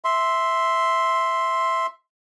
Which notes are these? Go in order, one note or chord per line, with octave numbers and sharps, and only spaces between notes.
E5 C6